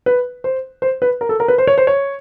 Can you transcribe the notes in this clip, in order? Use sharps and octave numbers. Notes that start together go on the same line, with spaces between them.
B4
C5
C5
B4
A#4
A4
A#4
B4
C5
C#5
C5
C#5